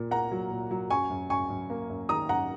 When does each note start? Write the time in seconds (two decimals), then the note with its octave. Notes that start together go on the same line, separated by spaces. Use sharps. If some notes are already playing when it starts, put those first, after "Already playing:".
Already playing: A#2 A#3
0.11 A#3 F#5 A#5
0.31 F#3
0.51 A#2
0.71 F#3
0.90 F#2 G#5 C#6
1.10 F#2
1.30 F#2 G#5 C#6
1.50 F#2
1.70 A#3
1.90 F#2
2.09 D#3 A#5 D#6
2.29 F#2 F#5 A#5